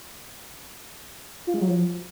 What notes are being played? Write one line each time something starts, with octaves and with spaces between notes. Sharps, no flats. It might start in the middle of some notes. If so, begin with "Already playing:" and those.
F4
G#3
F#3
F3